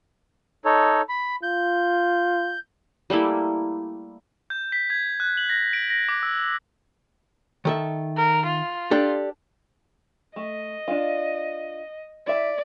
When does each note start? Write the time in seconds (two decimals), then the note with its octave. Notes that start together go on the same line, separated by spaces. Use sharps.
0.65 D#4 A4 C#5
1.09 B5
1.43 F4 G6
3.10 G3 A3 A#3 E4
4.50 G6
4.72 B6
4.90 G#6
5.20 F#6
5.37 F#7
5.50 A#6
5.73 D7
5.90 A#6
6.09 D6
6.23 E6
7.65 D#3 A4 E5
8.17 A#4
8.46 F4
8.91 D4 G4 A4
10.36 A3 D#5
10.88 D4 F4
12.27 E4 D5 E5